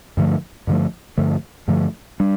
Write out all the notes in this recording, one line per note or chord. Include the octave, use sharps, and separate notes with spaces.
G2 D3 F3 A3
G2 D3 F3 A3
G2 D3 F3 A3
G2 D3 F3 A3
G3 D4